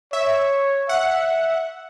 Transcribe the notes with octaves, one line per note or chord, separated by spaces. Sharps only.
C#5 E5
E5 F#5